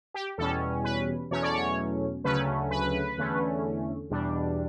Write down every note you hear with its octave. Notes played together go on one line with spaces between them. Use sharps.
G4
E2 B2 G3 C#4 A4
B4
E2 B2 F#3 A3 C#4 C#5
D5
C#5
D2 C#3 F#3 A3 C#4 B4
B4
E2 D3 A3 C#4
E2 B2 G3 D4